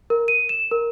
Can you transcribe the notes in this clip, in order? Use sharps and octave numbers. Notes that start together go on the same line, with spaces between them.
A#4
D#7
E7
A#4